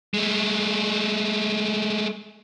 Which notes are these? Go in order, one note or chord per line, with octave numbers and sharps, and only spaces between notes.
G#3 A3